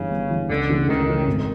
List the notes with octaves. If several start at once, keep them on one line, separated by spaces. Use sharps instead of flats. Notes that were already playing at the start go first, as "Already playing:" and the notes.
Already playing: G1 G2 C#3 E3
G1
G2 E3
C#2 D3
C#3 E3 A3 C#4
C#2 D#3
C#3 E3 A3 C#4
G#1